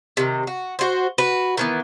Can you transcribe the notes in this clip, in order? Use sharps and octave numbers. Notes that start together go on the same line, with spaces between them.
C3 D#3
F#4
F#4 C5
F#4 B4
D#3 E3 B3